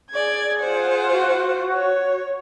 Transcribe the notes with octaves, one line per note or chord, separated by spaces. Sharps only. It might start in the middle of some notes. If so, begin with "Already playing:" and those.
G#4 D5 G#6
F4 C5 F#5
F#4
C#5